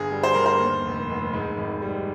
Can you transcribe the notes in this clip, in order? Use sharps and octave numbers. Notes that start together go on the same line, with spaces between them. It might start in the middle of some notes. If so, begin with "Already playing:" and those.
Already playing: G1 G#4
G3
C5
G1 A#4
C5
D#2
F1
F1
G#2
G#1
G3